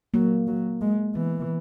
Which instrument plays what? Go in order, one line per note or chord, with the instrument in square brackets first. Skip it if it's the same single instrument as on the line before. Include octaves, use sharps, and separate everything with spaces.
[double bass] F#3 [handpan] A#3
[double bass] F#3
G#3
[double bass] E3 [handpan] B3